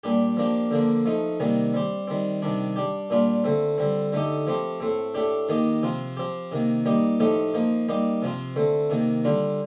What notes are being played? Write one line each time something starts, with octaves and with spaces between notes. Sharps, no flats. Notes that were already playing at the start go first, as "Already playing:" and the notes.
A#2 G3 D4 G4
F3 A#3 D4 G4
D3 F3 A#3 D4
F3 A3 D#4
C3 D#3 G3 A#3
G3 C4 G4
D#3 G3 C4
C3 D#3 G3 D4
G3 D4 G4
A#2 G3 D4 F4
D3 A3 C4
D3 G3 C4
D3 A3 D#4 G4
F3 A3 C4 G4
A2 A3 C4
A2 A3 D4 G4
D#3 A#3 D#4 G4
C3 F3 C4 F4
F3 C4 G4
C3 D#3 A#3
G3 A#3 D#4 G4
A2 F3 A3 D#4 G4
F3 A#3 D#4
G3 A#3 D#4 G4
C3 F3 C4 F4
D3 A3 C4
C3 D#3 A#3
D3 G3 D4 F4